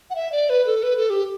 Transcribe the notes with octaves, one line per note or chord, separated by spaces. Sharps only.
F#5
E5
D5
B4
A4
B4
A4
G4